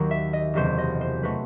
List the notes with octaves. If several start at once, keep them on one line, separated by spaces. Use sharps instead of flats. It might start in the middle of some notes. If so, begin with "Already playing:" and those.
Already playing: D#2 D#3 F#3
E5
D#5
F#1 E2 C3 F#3 C5
D#5
C5
F#3 A3 B4